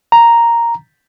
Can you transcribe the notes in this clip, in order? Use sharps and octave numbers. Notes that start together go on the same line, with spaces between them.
A#5